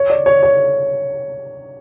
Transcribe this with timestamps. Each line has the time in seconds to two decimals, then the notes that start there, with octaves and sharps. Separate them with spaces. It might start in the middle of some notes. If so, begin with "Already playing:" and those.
Already playing: C#5
0.10 D5
0.26 C#5
0.43 C#5